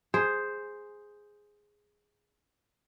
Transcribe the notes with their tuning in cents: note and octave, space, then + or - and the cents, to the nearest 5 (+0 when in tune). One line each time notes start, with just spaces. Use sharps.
G#4 +0 C5 +0